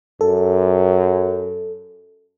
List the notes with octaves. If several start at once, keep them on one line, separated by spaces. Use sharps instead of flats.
F#2 A4